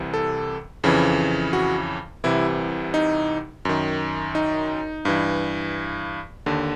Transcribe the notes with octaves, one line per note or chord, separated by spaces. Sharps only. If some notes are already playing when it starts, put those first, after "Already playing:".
Already playing: C2 C3 E3
A4
F2 C#3 E3
F#4
C2 C3 E3 E4
D#4
F#2 D#3
D#4
G2 E3
D#2 D3